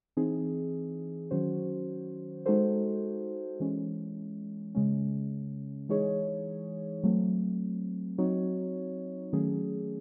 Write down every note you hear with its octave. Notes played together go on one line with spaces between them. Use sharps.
E3 C4 D#4 G#4
D#3 F#3 C#4 F#4 C5
G#3 D#4 F#4 A4 C5
E3 G#3 C#4
C#3 G#3 C#4
E3 G#3 D#4 G#4 C#5
F#3 A3 C4
F#3 C4 D#4 F#4 C#5
D#3 F#3 A3 C#4 G#4